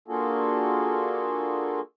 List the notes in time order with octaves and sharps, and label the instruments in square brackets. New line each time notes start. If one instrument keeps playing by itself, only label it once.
[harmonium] A#3 D4 F4 F#4 G#4 A4